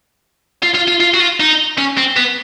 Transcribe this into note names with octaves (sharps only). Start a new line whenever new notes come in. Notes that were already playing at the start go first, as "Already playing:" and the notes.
F4
F4
F4
F4
F#4
F4
D#4
C#4
C4
B3